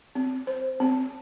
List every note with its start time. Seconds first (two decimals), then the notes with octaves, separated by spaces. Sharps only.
0.15 C4
0.47 C5
0.80 C4